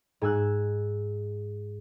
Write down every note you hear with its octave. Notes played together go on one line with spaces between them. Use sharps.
G#2 G#5 E6 F#6